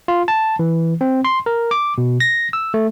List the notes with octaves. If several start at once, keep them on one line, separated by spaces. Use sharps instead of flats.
F4
A5
E3
C4
C6
A#4
D6
B2
A#6
E6
A3